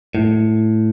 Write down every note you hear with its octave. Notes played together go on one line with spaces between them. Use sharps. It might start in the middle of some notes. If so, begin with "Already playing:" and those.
A2